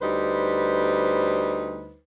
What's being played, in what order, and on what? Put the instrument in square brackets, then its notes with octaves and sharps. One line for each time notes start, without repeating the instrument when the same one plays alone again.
[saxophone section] D2 G3 D#4 B4 C5